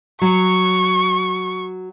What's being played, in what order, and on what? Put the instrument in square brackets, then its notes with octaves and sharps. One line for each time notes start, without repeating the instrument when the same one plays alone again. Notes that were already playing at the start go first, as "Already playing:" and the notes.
[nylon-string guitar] F#3 [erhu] C#6